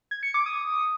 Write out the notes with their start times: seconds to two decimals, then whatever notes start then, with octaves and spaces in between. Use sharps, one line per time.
0.11 G#6
0.23 C#7
0.34 D6
0.46 D#6